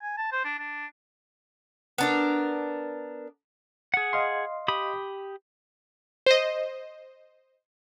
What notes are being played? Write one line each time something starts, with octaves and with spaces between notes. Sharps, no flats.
G#5
A5
C5
D4
D4
B3 D4 A#4
G#4 F#5
D#5 F5 C6
G4 B5 D#6
C5 D#5